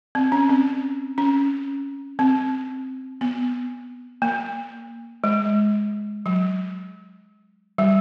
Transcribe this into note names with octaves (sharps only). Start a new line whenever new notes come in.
C4
C#4
C4
C#4
C4
B3
A#3
G#3
F#3
G3